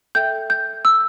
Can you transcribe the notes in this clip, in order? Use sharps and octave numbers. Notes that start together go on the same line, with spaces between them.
A4 E5 G5 G6
G6
E6